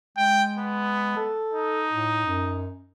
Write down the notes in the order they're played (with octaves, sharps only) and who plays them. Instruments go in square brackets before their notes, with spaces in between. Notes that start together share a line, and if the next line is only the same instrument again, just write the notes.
[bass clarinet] G#3 [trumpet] G5
[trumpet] B3
[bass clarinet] A4
[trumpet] D#4
[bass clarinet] A2
F#2